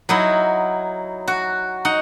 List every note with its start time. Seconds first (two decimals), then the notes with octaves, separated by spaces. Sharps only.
0.09 F#3 D#4 E4
1.28 F#4
1.85 D#4 F#5